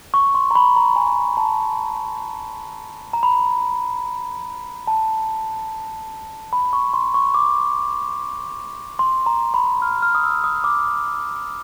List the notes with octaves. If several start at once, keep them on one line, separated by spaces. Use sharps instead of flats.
C#6
C6
A#5
B5
A#5
G#5
A5
A#5
B5
A5
B5
C#6
C6
C#6
D6
C6
A#5
B5
F6
F6
D#6
E6
D#6
D6